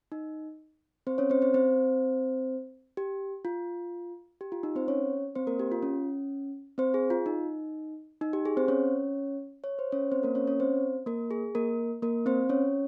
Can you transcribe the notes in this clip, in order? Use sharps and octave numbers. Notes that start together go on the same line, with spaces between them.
D#4
C4 C5
C#4 C#5
C4 C5
C4 C5
C4 C5
G4
F4
G4
F4
D#4
C4 C5
C#4 C#5
C4 C5
A#3 A#4
G4
F4
C#4
C4 C5
G#4
F4
D#4
D#4
G4
G#4
C4 C5
C#4 C#5
C#5
C5
C#4 C#5
C4 C5
A#3 A#4
C#4 C#5
C#4 C#5
C4 C5
A#3 A#4
G#4
A#3 A#4
A#3 A#4
C4 C5
C#4 C#5